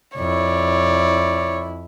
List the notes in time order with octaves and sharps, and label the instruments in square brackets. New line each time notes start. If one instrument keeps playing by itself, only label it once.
[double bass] F2 E4 [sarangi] C#5 [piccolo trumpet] D5